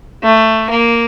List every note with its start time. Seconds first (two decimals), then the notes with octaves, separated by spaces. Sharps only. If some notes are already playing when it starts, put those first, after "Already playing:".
0.23 A3
0.70 A#3